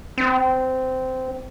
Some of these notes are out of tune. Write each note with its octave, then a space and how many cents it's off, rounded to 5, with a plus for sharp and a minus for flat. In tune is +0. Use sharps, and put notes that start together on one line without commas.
C4 -15